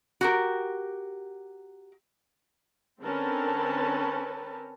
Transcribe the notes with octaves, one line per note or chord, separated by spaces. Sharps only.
F#4 G4 A#4
D3 C4 C#4 A#4 B4 A5